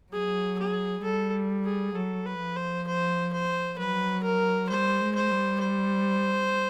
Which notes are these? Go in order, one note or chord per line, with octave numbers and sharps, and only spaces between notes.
F#3 G#4
G#4
G3 A4
G#4
F#3 A4
B4
F3
C5
C5
C5
F#3 B4
A#4
G3 C5
G#3
C5
G3
C5